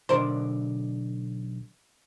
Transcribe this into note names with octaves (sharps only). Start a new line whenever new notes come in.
B1 D3 A#4 C5 D5